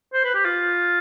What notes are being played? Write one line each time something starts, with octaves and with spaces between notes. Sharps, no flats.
C5
B4
G4
F4